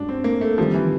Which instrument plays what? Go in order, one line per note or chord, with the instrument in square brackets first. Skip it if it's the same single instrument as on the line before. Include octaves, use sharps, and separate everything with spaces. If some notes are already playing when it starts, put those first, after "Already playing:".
Already playing: [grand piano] G2 G#3 C#4 [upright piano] D4 F#4
[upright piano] C4
A#3
A3
[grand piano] D#3 G3 C4 [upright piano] F3
[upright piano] E3